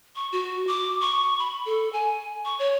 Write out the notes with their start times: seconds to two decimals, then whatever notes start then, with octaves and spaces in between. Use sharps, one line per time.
0.16 C#6
0.32 F#4
0.67 D6
1.01 C#6
1.39 B5
1.66 A4
1.93 G#5
2.45 C#6
2.59 C#5